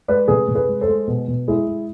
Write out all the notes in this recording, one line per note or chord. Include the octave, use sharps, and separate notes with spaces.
G#3 B4 D5
C3 G#4 B4
C3
G#4 B4
G#3
A4 C5
G#3
B2
B2
G#3 E4 G#4
G#3